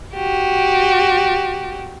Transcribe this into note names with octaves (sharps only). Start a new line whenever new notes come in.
F#4 G4